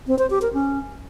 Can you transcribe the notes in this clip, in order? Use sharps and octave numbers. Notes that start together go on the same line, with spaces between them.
C4
C5
G4
A#4
C#4